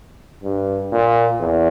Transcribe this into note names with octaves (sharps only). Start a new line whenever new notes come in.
G2
A#2
E2